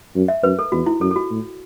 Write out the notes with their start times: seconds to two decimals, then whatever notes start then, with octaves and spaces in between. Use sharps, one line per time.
0.15 F#2
0.28 E5
0.43 F#2 B4
0.59 A4
0.72 E2 F#4
0.86 E4
1.01 F#2 A4
1.11 A4
1.16 F#4
1.31 A2